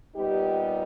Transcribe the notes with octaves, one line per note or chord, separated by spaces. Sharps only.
A#2 G3 B3 D#4 G4